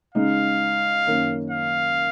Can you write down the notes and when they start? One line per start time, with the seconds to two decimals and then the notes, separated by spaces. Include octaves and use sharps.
0.14 C#3 G#3 D#4 F5
1.06 F#2 D#3 A#3 C#4
1.50 F5